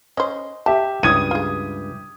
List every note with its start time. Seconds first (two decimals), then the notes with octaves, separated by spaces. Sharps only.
0.17 C#4 C5 D#5
0.66 G4 E5 A5
1.03 C#2 G2 E4 D#6 G#6 D#7
1.31 F4 G#4